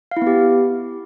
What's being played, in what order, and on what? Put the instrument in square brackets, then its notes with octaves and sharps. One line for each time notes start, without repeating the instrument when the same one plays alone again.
[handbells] F5
E4
B3
G4